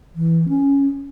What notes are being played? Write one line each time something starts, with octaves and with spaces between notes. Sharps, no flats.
E3
C#4